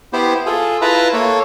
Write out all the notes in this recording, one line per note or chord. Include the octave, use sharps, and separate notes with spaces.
B3 E4 G4 C5
F4 G#4 A4
E4 F4 B4 E5 A5 A#5
A#3 A4 C#5